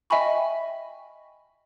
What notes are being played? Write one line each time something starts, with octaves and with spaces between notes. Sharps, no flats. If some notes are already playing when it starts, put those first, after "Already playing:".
D#5 E5 G5 G#5 B5 C#6